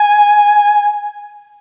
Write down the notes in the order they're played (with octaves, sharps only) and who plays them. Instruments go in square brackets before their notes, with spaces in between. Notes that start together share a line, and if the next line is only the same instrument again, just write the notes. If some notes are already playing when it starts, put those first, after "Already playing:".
Already playing: [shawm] G#5